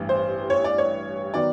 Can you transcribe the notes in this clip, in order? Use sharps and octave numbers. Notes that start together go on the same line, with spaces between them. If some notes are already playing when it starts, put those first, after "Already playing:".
Already playing: A1 G2 E3
C5
C#5
D5
C#5
D#3 F#3 B3 D5